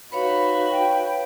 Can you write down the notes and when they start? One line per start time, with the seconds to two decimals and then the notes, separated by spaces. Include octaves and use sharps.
0.12 D#4 F#4 B4 C#5 F5 B5
0.71 G5